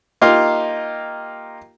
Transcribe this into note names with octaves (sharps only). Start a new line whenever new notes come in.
A#3 D#4 F4 G4